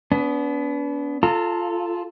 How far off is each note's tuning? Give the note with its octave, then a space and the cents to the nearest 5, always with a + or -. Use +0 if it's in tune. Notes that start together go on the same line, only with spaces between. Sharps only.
B3 +0 D4 -40
F4 -5 A4 -10 A#5 -35